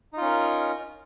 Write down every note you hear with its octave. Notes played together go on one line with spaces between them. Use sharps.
C#4 D#4 F4 A#4